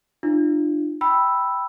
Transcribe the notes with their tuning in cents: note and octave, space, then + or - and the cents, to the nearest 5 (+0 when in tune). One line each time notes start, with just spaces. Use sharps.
D4 +35 F4 -20
G5 +0 B5 +0 E6 +0